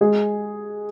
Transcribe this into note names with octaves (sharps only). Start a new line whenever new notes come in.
G#3 G#4